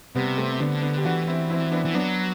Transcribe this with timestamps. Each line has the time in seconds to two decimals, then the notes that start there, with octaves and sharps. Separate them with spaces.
0.15 C3 G3 B3
0.38 A3 C4
0.60 D3 B3 D4
0.82 B3 D4
0.97 G4
1.04 E3 D4 F#4
1.27 C4 E4
1.50 C4 E4
1.71 B3 D4
1.85 E3
1.94 F#3 B3 D4